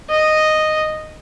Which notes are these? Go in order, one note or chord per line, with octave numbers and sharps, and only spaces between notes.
D#5